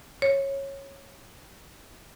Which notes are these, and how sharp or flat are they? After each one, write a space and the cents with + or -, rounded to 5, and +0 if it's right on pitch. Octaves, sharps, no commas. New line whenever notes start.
C#5 -15